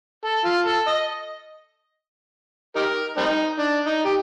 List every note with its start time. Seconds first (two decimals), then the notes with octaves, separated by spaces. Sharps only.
0.25 A4
0.45 F4
0.66 A4
0.87 D#5
2.76 D#4 G4 A#4
3.17 G3 C4 D#4
3.59 D4
3.86 D#4
4.05 G4